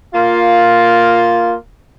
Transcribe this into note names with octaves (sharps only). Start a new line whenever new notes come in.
A#3 F4